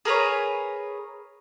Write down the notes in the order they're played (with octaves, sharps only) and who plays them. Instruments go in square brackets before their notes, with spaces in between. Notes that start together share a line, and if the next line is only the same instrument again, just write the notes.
[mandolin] G#4 A#4 B4 C#5